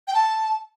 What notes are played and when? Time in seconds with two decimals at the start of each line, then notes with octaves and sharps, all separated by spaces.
0.08 G5
0.14 A5